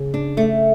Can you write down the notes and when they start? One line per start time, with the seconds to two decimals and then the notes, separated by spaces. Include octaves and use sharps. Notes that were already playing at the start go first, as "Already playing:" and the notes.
Already playing: C#3
0.14 D4
0.37 A3